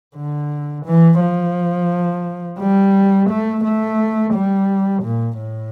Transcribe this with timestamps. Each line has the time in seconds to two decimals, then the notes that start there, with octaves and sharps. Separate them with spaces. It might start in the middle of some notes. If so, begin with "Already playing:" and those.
0.16 D3
0.85 E3
1.20 F3
2.60 G3
3.29 A3
3.64 A3
4.34 G3
5.03 A#2
5.38 A2